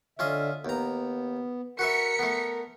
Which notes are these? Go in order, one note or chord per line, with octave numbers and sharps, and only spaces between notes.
D3 C#4 F4 D#5 E5
D#2 B3 A#5
F#4 A#4 B4 E5 B6 C#7
A3 B3